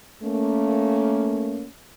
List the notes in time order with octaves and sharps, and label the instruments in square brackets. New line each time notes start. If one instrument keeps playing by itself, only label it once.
[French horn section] A3 A#3 C#4